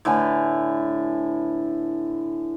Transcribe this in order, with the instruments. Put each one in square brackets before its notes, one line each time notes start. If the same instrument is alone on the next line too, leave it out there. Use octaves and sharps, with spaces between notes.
[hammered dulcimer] A2 D3 B4 G#5